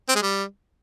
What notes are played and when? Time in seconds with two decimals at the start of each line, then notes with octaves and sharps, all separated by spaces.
0.09 C4
0.15 G#3
0.22 G3